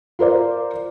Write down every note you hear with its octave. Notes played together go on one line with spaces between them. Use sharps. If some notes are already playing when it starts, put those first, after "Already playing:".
F4 A#4 C5 D5